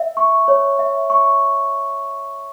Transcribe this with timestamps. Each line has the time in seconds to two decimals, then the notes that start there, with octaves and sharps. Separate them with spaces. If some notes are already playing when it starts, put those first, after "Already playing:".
Already playing: E5
0.17 C#6
0.48 C#5
0.79 E5
1.10 C#6